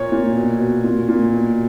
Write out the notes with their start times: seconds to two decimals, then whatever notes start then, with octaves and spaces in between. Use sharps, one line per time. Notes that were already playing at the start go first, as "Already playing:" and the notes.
Already playing: A#2 C#5
0.12 A#2
0.36 B2
0.60 B2
0.84 A#2
1.09 A#2
1.33 B2